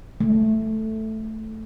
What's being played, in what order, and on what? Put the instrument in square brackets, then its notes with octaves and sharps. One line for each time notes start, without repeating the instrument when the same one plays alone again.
[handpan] A3